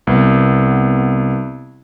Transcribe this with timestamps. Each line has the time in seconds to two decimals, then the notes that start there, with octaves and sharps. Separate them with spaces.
0.07 C2 B3